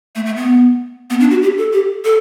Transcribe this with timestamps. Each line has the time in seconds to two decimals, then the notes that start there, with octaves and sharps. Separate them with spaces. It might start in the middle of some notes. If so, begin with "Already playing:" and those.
0.15 A3
0.26 A3
0.37 B3
1.10 B3
1.20 D4
1.31 F#4
1.42 G4
1.57 A4
1.73 G4
2.05 A4